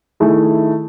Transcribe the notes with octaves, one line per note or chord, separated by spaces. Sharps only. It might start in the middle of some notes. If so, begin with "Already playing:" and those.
D#3 A3 E4 G#4